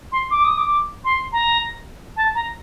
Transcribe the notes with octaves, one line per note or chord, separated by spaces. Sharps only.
C6
D6
D#6
D6
C6
A#5
A5
A#5